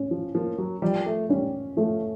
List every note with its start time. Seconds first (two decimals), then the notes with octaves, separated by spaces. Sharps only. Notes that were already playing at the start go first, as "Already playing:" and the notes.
Already playing: C#4
0.11 F3
0.34 F3 A#3
0.58 F#3
0.82 F3 G3
1.06 A3
1.29 G3 C#4
1.77 F3 A3